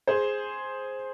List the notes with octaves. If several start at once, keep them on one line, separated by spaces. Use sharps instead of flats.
G#4 C5